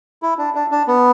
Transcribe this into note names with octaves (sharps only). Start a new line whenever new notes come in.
E4
D4
D4
D4
B3